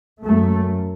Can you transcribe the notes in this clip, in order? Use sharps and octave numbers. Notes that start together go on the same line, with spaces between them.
F#2 A3